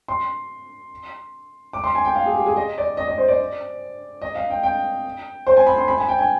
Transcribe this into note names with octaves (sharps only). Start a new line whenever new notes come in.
C6
D6
C6
G#5
G5
F5
G#4
G4
G#4
D#5
D5
D#5
D#5
C5
D5
D#5
F5
G5
G5
C5
G#5
B5
C6
B5
G#5
G5
G#5